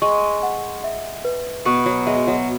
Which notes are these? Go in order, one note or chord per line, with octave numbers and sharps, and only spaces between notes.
G#3 C#6
F#5
E5
B4
B2 B3 C#6
F#3
G#3 E5
F#3